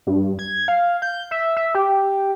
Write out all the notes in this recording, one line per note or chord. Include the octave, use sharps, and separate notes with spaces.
G2
G#6
F5
G6
E5
E5
G4